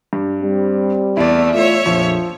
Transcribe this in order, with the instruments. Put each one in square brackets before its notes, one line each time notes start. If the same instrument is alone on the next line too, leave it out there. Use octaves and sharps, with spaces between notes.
[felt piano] G2
[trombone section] G3 C4
[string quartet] E2 A3 [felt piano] E4 D5
[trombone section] A3 F4 [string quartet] C#5 E5
[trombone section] A#1 F2 A#2 [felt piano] F3